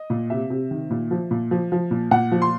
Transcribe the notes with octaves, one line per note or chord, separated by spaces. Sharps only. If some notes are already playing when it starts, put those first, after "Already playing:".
Already playing: D#5
A#2
C3 E5
C3
D#3
A#2
F3
A#2
F3
F3
A#2
A#2 F#5
F3
C6